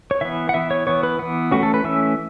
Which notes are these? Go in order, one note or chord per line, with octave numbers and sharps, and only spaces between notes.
C#5
E3 B3 E5
F#5
E3 B3 E5
C#5
E3 B3 C#5
B4
E3 B3
E3 A3 C#4 F#4
A4
B4
E3 A3 C#4 E5